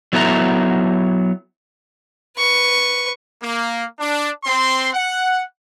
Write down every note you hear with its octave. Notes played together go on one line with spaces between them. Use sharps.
F#3 B3 E4 A4 E5 A#5
B4 C#6
A#3
D4
C4 C6
F#5